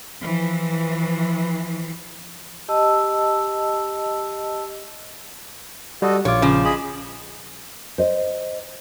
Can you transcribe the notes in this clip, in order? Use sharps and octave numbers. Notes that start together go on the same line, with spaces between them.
E3 F3
G4 D#5 A5 E6
G3 F#4 A4 D#5
A#1 F4 C#5 D6
C#3 F3
G#4 D#5 B5
C5 D#5